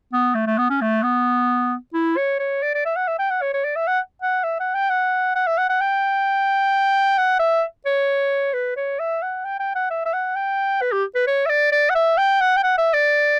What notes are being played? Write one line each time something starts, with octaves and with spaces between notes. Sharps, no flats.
B3
A3
A3
B3
C#4
A3
B3
E4
C#5
C#5
D5
D5
E5
F#5
E5
G5
F#5
C#5
C#5
D5
E5
F#5
F#5
E5
F#5
G5
F#5
F#5
E5
F#5
F#5
G5
F#5
E5
C#5
B4
C#5
E5
F#5
G5
G5
F#5
E5
E5
F#5
G5
B4
G4
B4
C#5
E5
D5
D5
F#5
E5
G5
F#5
G5
F#5
E5
D5